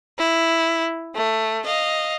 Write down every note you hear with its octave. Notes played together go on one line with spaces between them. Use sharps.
E4
A3
D#5 F5